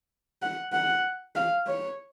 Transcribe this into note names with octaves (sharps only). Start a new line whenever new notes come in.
F#5
F#5
F5
C#5